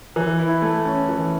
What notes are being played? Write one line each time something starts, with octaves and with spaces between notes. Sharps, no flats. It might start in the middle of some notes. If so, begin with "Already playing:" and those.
E3
E4
A3
C#4
E3